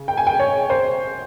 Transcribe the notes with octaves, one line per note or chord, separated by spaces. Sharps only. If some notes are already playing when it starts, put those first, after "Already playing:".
Already playing: C#3
G5
G#5
G5
C#5
C5